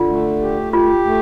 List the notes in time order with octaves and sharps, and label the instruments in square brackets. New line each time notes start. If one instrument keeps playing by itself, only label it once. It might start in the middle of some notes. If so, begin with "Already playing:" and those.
Already playing: [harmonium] D3 [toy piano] F4
[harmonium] A3
G4
[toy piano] F4 [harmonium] G4
[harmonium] A3